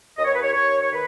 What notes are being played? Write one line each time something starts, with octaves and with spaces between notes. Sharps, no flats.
D#2 D#5
C#5
B4
C#5
D#2 C#5
C#5
D#3 B4